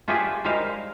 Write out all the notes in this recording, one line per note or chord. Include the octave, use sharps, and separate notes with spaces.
F4 G4 G#4 B4 D5 E5
G3 G#3 E4 A#4 C5 F5